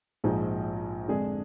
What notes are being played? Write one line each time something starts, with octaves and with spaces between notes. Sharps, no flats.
A#1 G#2 F3 G#3 D#4
F2 D3 G#3 D4 G#4